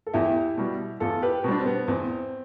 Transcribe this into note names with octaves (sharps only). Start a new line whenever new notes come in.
A4
E2 E4 G4
B2 G3
E2 F4 A4
G4 B4
B2 G3 C4 D4
C4
B3
E2 C4